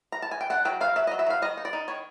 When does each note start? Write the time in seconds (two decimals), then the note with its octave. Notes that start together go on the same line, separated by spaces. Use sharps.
0.12 A#5
0.22 A5
0.31 G#5
0.41 G5
0.50 D4 F#5
0.65 F#3 G5
0.81 F#3 F5
0.96 F#3 E5
1.07 D#5
1.11 F#3
1.19 E5
1.27 F#3 F5
1.42 D#3 D#5
1.57 D#4
1.65 D5
1.73 D#4
1.88 D#3 C#5